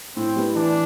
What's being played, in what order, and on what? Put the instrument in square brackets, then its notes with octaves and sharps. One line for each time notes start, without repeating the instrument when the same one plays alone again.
[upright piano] A2 [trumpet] C4
[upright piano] G3 B3
[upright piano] E3 [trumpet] D4